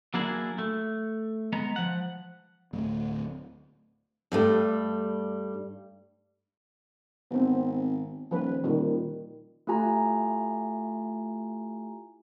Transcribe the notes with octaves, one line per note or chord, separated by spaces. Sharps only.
F#3 A#3 D4 E4 G#4
A3
G#3 B3 A#5
F3 F#5
D1 A3
G2 G3 A3
G#1 B3 C4
D#1 F3 B4
D#1 A#2 D#3 G3
A3 E4 F4 G4 G#5 A#5